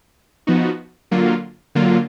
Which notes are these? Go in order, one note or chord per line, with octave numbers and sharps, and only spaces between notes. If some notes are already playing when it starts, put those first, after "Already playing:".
F3 B3 D#4 F#4
D3 F#3 A#3 F4
D3 F#3 A#3 F4